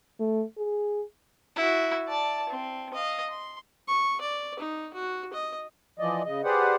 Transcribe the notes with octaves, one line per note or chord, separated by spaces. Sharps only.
A3
G#4
E4 F#4
D5 A5
C4
D#5 F5
C6
C#6
D5
D#4
F#4
D#5
E3 F3 D5 D#5
C#3 D#5
G4 G#4 B4 C5 D5 F#5